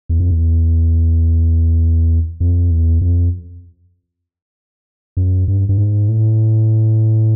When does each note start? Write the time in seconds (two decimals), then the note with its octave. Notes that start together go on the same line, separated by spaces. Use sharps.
0.09 E2
0.20 F2
0.30 E2
2.40 F2
2.71 E2
3.01 F2
5.17 F#2
5.48 G2
5.69 G2
5.78 G#2
6.09 A2